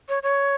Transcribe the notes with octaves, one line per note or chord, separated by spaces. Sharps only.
C#5
C#5